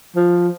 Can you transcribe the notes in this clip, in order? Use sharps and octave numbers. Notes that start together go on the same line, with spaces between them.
F3